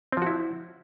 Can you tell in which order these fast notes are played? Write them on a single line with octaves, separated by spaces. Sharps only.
C4 F3 F#4 E4